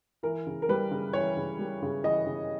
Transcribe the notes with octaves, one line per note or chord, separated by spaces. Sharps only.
E3 A#4
C#3
A#4
G3 B4
C#3
E3 C#5
C#3
G3
C#3
E3 D#5
C#3